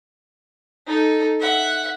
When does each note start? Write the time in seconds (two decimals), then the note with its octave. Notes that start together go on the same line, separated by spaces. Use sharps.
0.87 D#4 A4
1.40 E5 F#5